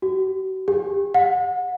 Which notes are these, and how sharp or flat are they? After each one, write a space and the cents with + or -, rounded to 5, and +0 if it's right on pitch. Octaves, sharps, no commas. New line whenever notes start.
F#4 +40
G4 +40
F#5 -30